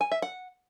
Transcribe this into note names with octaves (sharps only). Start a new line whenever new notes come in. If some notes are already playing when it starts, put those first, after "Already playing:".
G#5
E5
F#5